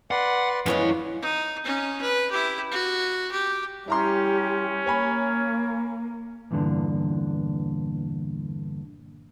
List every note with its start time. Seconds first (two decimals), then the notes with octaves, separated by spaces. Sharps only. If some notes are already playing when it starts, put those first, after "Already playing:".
0.11 B4 D5 F#5 C6
0.66 F#2 E3 F3 G#3 B3 C#5
1.22 D#4
1.65 C#4 D#4
2.01 B4
2.31 E4 G4
2.72 F#4
3.31 G4
3.88 G3 C#4 E4 G4 A#5 C6
4.86 A#3 C#5 G#5 B5
6.51 E2 G2 A#2 D3